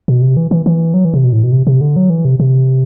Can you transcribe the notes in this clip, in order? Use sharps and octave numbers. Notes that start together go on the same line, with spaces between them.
B2
C3
E3
E3
E3
F#3
E3
C3
B2
A2
B2
C3
C3
D3
F#3
E3
C3
C3